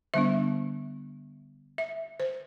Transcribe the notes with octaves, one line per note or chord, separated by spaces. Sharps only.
D3 G3 B3 D4 E5
E5
C5